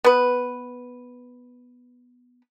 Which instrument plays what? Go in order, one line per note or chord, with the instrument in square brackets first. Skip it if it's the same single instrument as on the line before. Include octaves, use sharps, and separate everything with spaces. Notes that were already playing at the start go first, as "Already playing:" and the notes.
[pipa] B3 B4